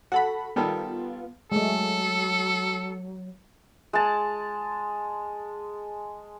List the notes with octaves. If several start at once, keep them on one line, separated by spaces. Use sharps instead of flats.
F#4 A4 F#5 B5
D#3 G3 B3 F4 A4
F#3 G#3 A3 A4
G#3 A5